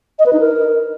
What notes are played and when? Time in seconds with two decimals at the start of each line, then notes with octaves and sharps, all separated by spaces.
0.19 D#5
0.26 B4
0.33 D#4
0.40 A#4